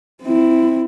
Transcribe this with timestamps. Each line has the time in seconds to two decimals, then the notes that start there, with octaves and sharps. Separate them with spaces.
0.23 C4 E4